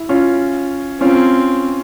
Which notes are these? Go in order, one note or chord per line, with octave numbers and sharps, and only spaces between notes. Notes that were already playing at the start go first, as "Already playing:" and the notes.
Already playing: E4
C#4 F4
C4 C#4 F4